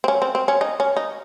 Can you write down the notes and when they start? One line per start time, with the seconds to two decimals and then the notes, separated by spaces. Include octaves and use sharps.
0.04 C4
0.08 C#4
0.22 C4
0.35 C4
0.48 C#4
0.61 D#4
0.80 C#4
0.97 D#4